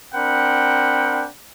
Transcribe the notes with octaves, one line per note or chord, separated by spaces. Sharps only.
C4 D4 A#4 F#5 G5 B5